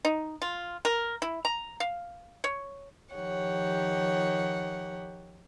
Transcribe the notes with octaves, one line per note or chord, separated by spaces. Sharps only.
D#4
F4
A#4
E4
A#5
F5
C#5
D#3 F3 G4 C#5 F#5